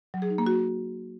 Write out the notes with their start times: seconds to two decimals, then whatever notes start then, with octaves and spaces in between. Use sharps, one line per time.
0.14 F#3
0.22 G#4
0.30 D#4
0.38 A#3
0.47 F#4